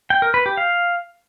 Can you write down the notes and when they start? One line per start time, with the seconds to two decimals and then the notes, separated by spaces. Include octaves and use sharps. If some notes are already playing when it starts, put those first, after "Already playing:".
0.10 G5
0.22 A#4
0.34 B4
0.46 G4
0.57 F5